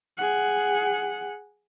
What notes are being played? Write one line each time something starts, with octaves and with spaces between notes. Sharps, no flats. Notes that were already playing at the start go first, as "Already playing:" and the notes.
G#4 F#5